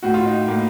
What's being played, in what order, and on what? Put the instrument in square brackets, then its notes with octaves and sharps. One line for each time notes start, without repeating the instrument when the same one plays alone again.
[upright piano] A2 F#4
F4
D#4
A2 A#3